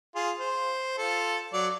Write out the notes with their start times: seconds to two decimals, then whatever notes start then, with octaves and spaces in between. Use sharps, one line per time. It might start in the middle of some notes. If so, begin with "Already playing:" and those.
0.15 F4 G#4
0.39 C5
0.98 F4 A4
1.53 F#3 D5